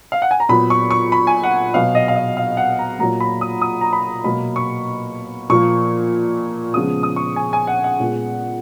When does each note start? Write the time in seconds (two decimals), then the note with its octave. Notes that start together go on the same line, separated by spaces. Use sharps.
0.12 F5
0.22 F#5
0.31 G#5
0.40 A#5
0.49 A#2 F#3 B3 B5
0.70 C#6
0.91 C#6
1.12 B5
1.27 G#5
1.43 F#5
1.74 B2 F#3 B3 F5
1.95 D#5
2.08 F5
2.15 D#5
2.37 F5
2.57 F#5
2.79 A#5
2.99 A#2 F#3 A#3 A#5
3.20 B5
3.41 D#6
3.62 D#6
3.81 A#5
3.93 B5
4.24 B2 F#3 A#3 B5
4.56 C#6
5.49 A#2 F3 A#3 C#6
6.74 C#3 F3 G#3 B3 D#6
7.03 D#6
7.16 C#6
7.36 G#5
7.53 G#5
7.67 F#5
7.84 F#5
8.00 A#2 G#3 B3